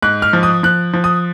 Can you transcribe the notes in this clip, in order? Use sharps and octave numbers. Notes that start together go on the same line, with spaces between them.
G#2 F#6
F6
F3
D#6
F3 F#6
F3
D#6